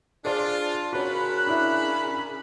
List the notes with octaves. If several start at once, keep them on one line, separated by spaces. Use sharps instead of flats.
D4 F4 G#4 C5 D5
C#3 F#4 A#4 C#5 B5 F#6
D4 E4 E5